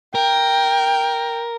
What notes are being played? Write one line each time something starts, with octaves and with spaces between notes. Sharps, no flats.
A#4 G5